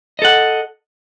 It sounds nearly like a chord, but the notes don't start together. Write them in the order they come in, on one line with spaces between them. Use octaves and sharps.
D#5 A4 F#5